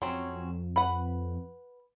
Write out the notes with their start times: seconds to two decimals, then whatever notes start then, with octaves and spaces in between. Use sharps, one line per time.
0.02 F2 F#3 C4 C#4
0.76 B4 F#5